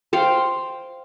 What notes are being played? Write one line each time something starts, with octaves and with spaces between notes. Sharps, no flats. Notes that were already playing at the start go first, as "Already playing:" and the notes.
C5 F5 G5